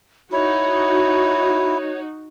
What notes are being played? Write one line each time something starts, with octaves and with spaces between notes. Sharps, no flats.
D#4 E4 F#4 C#5